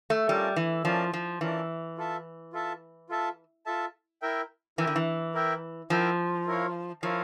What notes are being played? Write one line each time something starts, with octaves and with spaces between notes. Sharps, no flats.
A3
G3 C#4 F4 A#4 D5 A5
E3
F3 C#4 F4 A#4 D5 A5
F3
E3 C#4 F4 A#4 D5 A5
F4 A4 E5 A5
F4 A4 E5 A5
F4 A4 E5 A5
F4 A4 E5 A5
E4 A#4 E5 G5
E3 E4 A#4 E5 G5
D3
E3
E4 A#4 E5 G5
F3 E4 A#4 E5 G5
E4 A#4 C#5 F5
F3 E4 A#4 C#5 F5